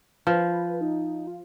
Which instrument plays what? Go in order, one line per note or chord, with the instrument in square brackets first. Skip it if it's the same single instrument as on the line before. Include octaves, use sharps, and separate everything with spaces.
[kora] F3 [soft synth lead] B4
[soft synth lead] D#4
F4